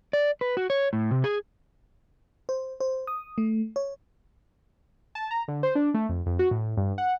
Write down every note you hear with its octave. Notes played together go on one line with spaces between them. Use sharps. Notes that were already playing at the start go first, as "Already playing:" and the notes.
D5
B4
F#4
C#5
A2
C3
G#4
C5
C5
D#6
A3
C#5
A5
A#5
D3
C5
D4
A3
F2
F2
F#4
A2
G2
F#5